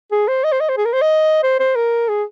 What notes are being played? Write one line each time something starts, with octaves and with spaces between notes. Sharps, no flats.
G#4
C5
D#5
C5
D#5
C5
G#4
A#4
C5
D#5
C5
C5
A#4
G#4